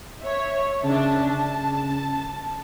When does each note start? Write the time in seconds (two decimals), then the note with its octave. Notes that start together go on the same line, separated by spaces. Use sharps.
0.21 C#5 E5
0.84 C#3 D4 E5 A5
1.31 C#3 A5